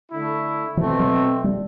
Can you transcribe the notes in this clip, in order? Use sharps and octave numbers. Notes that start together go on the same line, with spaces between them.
D3 A3 E4
B2 E3 A3 C4
F#3
G3